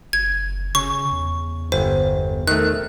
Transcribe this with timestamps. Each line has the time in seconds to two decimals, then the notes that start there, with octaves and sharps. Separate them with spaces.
0.13 F#1 G#6
0.75 C#3 C#4 C#6
1.12 E2
1.72 G1 C5
2.47 D#3 A3 F#6